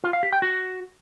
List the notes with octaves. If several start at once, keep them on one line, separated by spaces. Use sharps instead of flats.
F4
F5
G4
G5
F#4